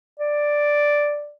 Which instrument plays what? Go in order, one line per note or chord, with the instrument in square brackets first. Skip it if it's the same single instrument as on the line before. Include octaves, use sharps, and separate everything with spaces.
[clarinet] D5